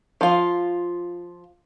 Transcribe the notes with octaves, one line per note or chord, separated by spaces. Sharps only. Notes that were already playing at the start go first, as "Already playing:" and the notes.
F3 F4